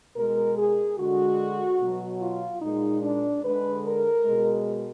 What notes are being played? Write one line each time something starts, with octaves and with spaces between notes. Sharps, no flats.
B2 G#3 A#4
G#4
D3 G#3 F#4
B2 F#3
F4
A#2 G#3 D#4
D4
D3 G#3 B4
A#4
B2 G#3